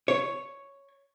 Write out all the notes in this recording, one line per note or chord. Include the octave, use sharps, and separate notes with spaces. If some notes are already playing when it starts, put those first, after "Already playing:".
C#5